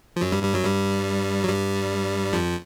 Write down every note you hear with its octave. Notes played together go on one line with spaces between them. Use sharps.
F3
F#2 F#3
G2 G3
G2 G3
F#2 F#3
G2 G3
F#3
G2 G3
F2 F3